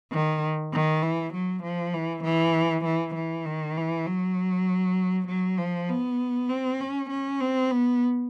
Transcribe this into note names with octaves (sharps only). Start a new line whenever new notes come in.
D#3
D#3
E3
F#3
F3
E3
E3
E3
E3
D#3
E3
F#3
F#3
F3
B3
C4
C#4
C#4
C4
B3